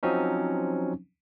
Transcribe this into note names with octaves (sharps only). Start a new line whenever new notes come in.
F3 F#3 C4 C#4 D#4